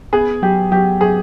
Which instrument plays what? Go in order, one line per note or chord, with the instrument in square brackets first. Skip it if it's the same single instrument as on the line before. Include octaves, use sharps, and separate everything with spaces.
[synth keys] B3 [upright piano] G#4
[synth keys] F#3 [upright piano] G4
[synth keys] F#3 [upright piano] G4
[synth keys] F#3 [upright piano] G#4